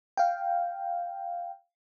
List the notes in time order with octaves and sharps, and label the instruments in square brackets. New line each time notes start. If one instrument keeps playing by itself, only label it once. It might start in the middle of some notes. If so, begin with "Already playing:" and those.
[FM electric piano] F5 G5